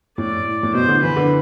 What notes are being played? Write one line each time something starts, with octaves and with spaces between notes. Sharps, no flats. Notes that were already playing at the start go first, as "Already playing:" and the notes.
A2 D5
A2
B2 C5
D3
E3 B4
D3